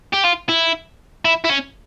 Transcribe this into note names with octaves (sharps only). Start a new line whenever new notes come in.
G4
F4
E4
E4
E4
C#4